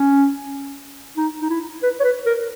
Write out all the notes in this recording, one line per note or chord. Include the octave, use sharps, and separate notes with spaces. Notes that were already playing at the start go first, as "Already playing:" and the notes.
Already playing: C#4
D#4
D#4
E4
B4
C#5
B4
A#4